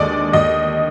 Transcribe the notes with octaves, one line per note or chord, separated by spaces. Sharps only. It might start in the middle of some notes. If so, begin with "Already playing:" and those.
Already playing: D#2 D3 G#3 D5 D#5
D#2 D#5